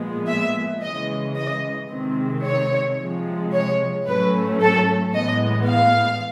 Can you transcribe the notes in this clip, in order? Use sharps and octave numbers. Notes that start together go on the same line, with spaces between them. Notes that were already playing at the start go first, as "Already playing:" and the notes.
Already playing: A#2 F3 G#3 B3
E5
C#3 E3 G#3 D#5
D#5
C3 D#3 G#3 C4
C#5
C3 F3 G#3
C#5
A2 F#3 A3 C#4 B4
A4
A2 E3 G#3 B3 D#5
F5